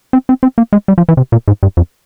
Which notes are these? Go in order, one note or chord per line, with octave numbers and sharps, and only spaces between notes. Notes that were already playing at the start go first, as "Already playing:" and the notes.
C4
C4
C4
A#3
G#3
G3
F3
E3
C3
A#2
G#2
G2
F2